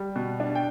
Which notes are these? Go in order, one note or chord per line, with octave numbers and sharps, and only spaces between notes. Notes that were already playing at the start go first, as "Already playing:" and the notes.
Already playing: G3
B2
D4
G5